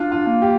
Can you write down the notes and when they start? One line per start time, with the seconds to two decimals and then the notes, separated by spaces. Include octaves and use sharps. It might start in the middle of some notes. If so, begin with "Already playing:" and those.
Already playing: D4 F4
0.12 F4
0.27 A#3
0.42 G4